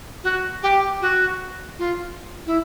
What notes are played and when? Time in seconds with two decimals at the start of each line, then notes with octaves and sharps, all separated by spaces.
0.23 F#4
0.62 G4
1.01 F#4
1.78 F4
2.46 E4